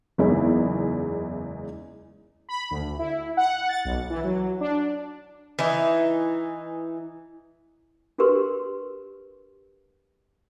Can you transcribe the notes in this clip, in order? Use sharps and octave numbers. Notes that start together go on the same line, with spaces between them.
F#1 E2 G#3 D#4 E4 G#4
B5
D2
E4
F#5
A6
B1
E3
F#3
D4
E3 D#4
D4 F#4 G4 A#4 B4 C6